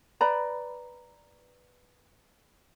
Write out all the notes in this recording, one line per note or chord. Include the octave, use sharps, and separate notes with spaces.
B4 D5 A#5 B5